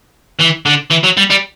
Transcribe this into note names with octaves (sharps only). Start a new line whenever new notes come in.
E3
D3
E3
F#3
G3
G3